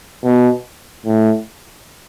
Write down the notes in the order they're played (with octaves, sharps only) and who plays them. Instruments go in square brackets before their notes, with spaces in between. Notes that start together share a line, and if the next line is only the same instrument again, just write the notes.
[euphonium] B2
A2